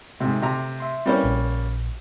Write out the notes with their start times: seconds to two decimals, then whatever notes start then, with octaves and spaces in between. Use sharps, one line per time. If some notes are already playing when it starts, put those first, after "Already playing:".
0.20 G#2 C3 A3
0.42 C3 A#5
0.80 E5 C6
1.06 G3 A#3 C4 C#4 E4 B4
1.23 A#1